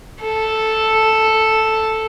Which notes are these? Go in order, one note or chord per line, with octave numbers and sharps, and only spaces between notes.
A4